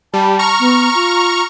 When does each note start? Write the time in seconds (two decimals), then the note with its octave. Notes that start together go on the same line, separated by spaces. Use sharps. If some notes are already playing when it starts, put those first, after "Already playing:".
0.13 G3 A5
0.39 A#5 C#6 F6
0.59 B3
0.94 F4